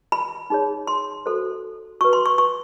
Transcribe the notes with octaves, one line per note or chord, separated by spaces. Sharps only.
B5
D#4 G#4 C#5
C6
F#4 A4 C5
F#4 B4 C#6
C6
C#6
C#6